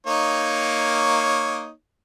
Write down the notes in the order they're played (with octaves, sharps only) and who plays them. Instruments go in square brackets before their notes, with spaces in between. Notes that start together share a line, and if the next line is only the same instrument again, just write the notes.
[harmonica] A#3 D#4 C#5